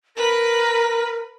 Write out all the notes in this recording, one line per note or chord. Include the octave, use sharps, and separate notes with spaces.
A#4 B4